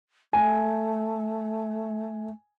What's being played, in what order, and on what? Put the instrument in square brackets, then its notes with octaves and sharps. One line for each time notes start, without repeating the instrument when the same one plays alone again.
[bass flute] A3 [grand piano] G#5